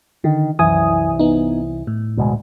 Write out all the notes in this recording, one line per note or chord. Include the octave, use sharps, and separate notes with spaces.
D3 D#3
C2 F#2 E3 G#5 D#6
B3 D#4
A2
D2 B2 G#3